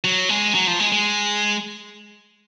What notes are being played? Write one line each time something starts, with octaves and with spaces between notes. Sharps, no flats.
F#3
G#3
F#3
F3
G#3
G#3